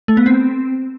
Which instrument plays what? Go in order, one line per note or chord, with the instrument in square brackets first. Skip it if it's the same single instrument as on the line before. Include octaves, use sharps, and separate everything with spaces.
[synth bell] A3
B3
C4